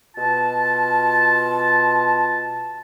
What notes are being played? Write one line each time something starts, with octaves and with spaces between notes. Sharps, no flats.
B2 F4 A5